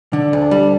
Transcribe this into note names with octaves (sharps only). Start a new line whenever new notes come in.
D3 D4
D2
G3